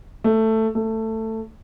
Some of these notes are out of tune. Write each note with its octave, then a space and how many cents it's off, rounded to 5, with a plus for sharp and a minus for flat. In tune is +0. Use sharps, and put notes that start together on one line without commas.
A3 +10
A3 +15